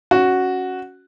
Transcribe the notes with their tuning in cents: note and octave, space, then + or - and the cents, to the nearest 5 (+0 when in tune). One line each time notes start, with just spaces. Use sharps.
C#4 +0 F#4 +0